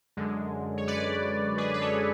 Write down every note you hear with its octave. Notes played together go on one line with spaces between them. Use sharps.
F#2 D3 G#3
C#5
B4 D5
G#4 B4
B4
A4 C#5